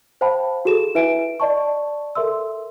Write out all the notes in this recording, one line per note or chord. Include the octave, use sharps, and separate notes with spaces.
C5 F5 G5 A5 B5
F#4 G#4 A4 E7
E4 B4 E5 G#5 D7
D5 D#5 A5 C#6
A4 A#4 E5 C6 E6